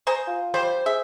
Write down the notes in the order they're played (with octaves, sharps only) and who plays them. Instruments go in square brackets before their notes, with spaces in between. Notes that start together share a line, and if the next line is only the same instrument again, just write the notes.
[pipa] G#4 C5 A#5
[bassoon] F4
[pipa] G3 [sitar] C5
[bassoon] G#4 [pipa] E5